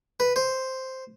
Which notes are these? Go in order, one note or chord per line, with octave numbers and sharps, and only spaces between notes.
B4
C5